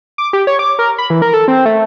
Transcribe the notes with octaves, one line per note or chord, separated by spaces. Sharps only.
D6
G4
C#5
D6
A#4
B5
E3
A#4
A4
C4
A3